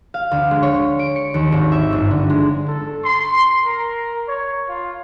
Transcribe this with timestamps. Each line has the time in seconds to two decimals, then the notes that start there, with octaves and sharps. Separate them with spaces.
0.14 F5
0.31 D2
0.51 G#3
0.63 C#5
0.99 D7
1.16 C#7
1.34 D#2
1.52 G#1
1.72 E5
1.93 G1
2.11 D3
2.30 G#3
2.67 A4
3.04 C6
3.64 A#4
4.28 C#5
4.69 F4